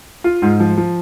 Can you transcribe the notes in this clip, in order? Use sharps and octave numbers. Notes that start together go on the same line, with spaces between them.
F4
G#2
F3
F3